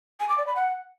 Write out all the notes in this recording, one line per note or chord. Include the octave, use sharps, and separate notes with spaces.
G#5
D6
D5
B5
F#5